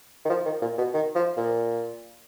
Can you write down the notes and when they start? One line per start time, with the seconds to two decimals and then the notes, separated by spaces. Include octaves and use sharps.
0.25 D#3
0.30 F3
0.46 D#3
0.62 A#2
0.78 B2
0.94 D#3
1.16 F3
1.37 A#2